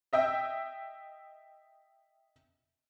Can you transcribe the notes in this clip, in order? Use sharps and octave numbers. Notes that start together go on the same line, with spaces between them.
D#5 E5 G5 E6